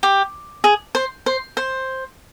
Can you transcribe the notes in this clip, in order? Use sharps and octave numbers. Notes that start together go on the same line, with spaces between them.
G4
G#4
C5
C5
C5